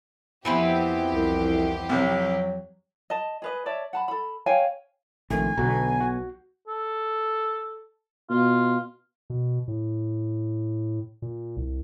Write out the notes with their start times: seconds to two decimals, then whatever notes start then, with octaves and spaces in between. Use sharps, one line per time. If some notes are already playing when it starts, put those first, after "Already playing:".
0.45 F2 E3 B3 C4 G4
1.13 C2
1.89 C2 C3 F#3
3.10 D#5 A5
3.42 G#4 B4 D#5
3.66 C#5 D5 E5 A5
3.93 F#5 A5 B5
4.08 A4 B5
4.46 C#5 F5 G5 G#5
5.30 A#1 C3 D#3 A3 G#5
5.58 B1 B2 D3 F#4 A#5
6.01 F#4
6.68 A4
8.30 B2 F4
9.30 B2
9.68 A2
11.22 A#2
11.57 C2